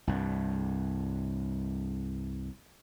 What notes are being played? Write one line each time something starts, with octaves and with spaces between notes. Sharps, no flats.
C2 G2